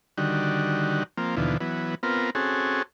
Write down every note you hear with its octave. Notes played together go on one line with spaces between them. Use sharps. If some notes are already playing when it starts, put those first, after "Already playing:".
D3 D#3 G3 F#4
F3 A#3 C4
D#2 B2 D3 E3 F3
E3 F#3 B3
B3 C4 F4 A#4
C4 C#4 F#4 G#4 A4